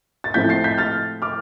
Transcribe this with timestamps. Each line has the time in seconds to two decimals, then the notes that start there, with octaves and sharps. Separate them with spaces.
0.24 A6
0.34 A2 F3 C4 G6 B6
0.49 A6 C7
0.64 G6 B6
0.78 F6 A6
1.22 D6 F6